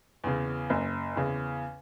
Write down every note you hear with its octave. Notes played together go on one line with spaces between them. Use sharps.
E2 C#3
F#1
E2 C#3